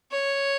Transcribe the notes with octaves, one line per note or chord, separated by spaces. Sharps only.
C#5